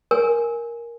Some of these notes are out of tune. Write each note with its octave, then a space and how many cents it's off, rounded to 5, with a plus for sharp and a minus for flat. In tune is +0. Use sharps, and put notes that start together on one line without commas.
A#4 +10 G#5 +0